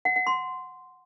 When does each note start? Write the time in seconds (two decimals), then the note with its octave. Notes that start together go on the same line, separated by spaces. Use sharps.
0.05 F#5
0.16 F#5
0.27 C6